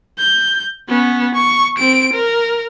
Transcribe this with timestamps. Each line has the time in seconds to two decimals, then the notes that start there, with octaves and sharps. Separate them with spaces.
0.19 G6
0.89 B3 C#4
1.34 C#6
1.78 C4 D7
2.13 A#4